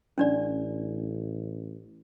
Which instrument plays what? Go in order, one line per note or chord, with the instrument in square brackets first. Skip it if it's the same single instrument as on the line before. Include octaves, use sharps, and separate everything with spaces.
[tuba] A1 [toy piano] C#4 D4 D5